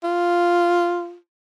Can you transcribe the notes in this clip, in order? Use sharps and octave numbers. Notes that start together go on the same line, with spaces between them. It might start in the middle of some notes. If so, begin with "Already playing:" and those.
F4